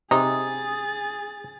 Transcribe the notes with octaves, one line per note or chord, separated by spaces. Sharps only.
C3 D#4 G#4 D#6 A6